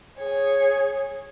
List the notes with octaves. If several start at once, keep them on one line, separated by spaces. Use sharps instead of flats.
G#4 C#5